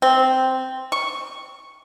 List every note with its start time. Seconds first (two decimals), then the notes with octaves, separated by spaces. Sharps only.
0.02 C4
0.92 C#6